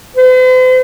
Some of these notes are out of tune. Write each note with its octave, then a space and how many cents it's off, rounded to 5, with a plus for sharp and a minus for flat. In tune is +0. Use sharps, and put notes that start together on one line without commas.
C5 -45